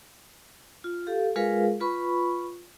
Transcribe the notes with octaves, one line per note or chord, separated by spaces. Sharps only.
F4
G4 A4 F5
G#3 F4 G#4 A#4 B4 F5
F4 B4 B5 C#6